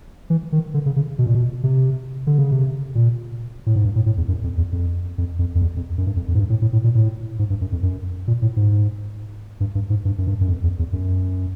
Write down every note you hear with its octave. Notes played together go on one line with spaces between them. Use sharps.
E3
D#3
D3
C#3
C#3
B2
A#2
B2
C3
D3
C#3
C3
A#2
A2
G#2
G2
A2
A2
E2
F#2
F2
E2
F2
F2
F2
F2
E2
F2
F#2
G2
F2
F2
G#2
G2
A2
A2
A2
A#2
A2
G#2
G2
F#2
F2
F#2
A#2
A2
G#2
G2
G2
G#2
G2
F#2
G2
F#2
F2
E2
E2
F#2